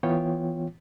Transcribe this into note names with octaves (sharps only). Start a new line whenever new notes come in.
E3 B3 F4 C#5 G5